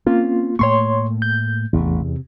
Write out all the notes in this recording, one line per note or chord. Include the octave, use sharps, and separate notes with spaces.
A#3 C4 C#4 F4
A2 A3 A#3 C#5 C6 C#6
G6
A1 E2 C3 A3
C3